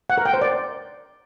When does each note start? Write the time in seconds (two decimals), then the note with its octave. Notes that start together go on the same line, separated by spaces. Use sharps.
0.10 F#5
0.18 A#4
0.26 G5
0.34 C5
0.42 D5